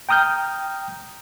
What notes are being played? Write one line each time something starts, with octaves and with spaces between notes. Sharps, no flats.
G5 A#5 D#6 F6 G6